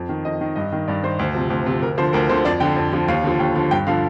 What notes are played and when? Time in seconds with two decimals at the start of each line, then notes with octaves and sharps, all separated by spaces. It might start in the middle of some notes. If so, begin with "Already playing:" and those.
Already playing: F2
0.09 D#3
0.25 F2 D#5
0.41 D#3
0.56 G2 D#5
0.72 D#3
0.88 G2 D5
1.03 D#3 C5
1.19 D2
1.35 C3 F3
1.50 D2
1.66 C3 F3
1.82 D2 A#4
1.98 D3 F3 C5
2.13 D2 A#4
2.29 D3 F3 C5
2.45 F2 D5
2.60 D3 F3 G5
2.76 F2
2.92 D3 F3
3.08 D#2 F5
3.24 D3 F3
3.39 D#2 G5
3.56 D3 F3
3.71 G2 G5
3.87 D3 F3 F5